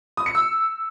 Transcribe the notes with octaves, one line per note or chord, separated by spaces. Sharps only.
D#6
C#7
E6